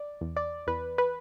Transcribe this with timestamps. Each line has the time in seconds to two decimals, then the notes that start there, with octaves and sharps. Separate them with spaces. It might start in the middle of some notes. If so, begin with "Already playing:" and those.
Already playing: D5
0.21 E2
0.37 D5
0.67 E2 B4
0.98 B4